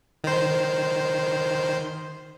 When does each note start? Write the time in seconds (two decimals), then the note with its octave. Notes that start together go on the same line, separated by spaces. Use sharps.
0.24 D#3 C5